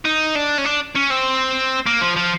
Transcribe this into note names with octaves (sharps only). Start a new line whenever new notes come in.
D#4
D4
C#4
D4
C#4
C4
A#3
F3
F3